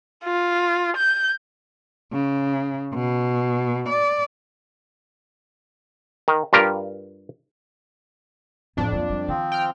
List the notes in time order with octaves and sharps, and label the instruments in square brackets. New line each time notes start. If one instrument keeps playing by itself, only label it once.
[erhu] F4
G6
[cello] C#3
B2
D5
[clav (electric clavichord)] D#3
G2 F4 G4 A#4
[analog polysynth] F2 D4 [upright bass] A2 G3
[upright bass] F#3 A#3
F#3 G3
[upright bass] D#3 [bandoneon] F3 C4
[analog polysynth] G5 F6